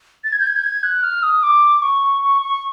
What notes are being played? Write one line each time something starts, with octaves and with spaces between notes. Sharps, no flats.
A6
G#6
G6
G#6
G6
G#6
F#6
F6
D#6
D6
C#6
C#6
C#6